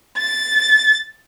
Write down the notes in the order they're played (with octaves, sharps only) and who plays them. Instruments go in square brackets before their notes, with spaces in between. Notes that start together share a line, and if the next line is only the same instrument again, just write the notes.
[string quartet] A6